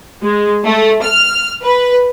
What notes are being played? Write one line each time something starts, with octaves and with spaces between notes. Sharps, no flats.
G#3
A3
F6
B4